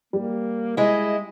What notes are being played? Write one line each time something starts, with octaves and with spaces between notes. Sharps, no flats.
G3 A#3
G#3 E4 D#5